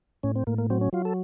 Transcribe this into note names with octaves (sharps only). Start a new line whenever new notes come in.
A2 C#4
C4
A2 A#3
A#3
F#3 C4
C#4
F#3 F4
A4